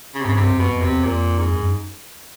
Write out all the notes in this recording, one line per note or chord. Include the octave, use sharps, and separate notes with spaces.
C#3
C3
G#2 C#3
G2 C3
F#2
B2
F2
C3
E2
F2 A#2
G#2
F#2